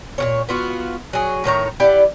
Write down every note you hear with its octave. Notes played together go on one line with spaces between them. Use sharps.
A#2 D#3 C#5
B3 F4 F#4
F#3 G#4
A2 D#3 C#5 A#5
E4 G4 D5 F#5